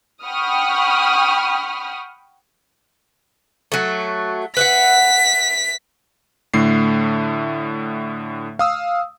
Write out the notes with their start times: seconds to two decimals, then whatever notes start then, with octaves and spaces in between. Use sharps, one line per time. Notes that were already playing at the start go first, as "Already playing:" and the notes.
0.24 F#5 G5 B5 C#6 D#6 F6
3.72 F#3 A3
4.57 B4 E5 F#5 B6
6.54 A2 D3 A3 C7
8.59 F5 D#6 E6